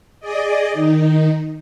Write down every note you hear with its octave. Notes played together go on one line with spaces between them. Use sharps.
G#4 D5 D#5
D#3 D#4